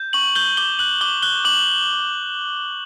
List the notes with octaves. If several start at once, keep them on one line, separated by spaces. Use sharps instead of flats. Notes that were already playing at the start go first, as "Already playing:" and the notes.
Already playing: G6
C#6 F#7
G6 G7
D6 G7
F#6 F#7
D6 G7
F#6 G7
D6 F#7